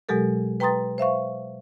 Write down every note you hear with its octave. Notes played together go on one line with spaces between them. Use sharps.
B2 F#3 G#3 G4 A4 A#4
B4 G5 A#5 C6 D#6 A6
C5 E5 F5 C#6